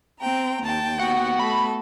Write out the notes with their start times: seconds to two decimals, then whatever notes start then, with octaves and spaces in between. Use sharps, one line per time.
0.19 C4 G5 A#5
0.63 D#2 G5 A5
0.99 B3 F#4 F#5
1.39 A3 A4 B5